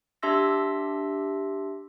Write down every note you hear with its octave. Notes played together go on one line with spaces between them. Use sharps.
D4 G4 E5 C6 E6 A#6